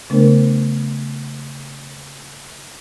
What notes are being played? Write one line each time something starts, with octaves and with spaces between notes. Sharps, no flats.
C#3 A3 B3 D4 A#4 C5